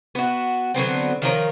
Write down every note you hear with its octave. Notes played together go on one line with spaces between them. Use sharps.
B3 F#4
D3 F#3 B3 C4
D#3 F3 A#4 C#5